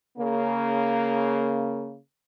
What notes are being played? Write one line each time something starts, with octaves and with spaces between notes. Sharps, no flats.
C#3 A#3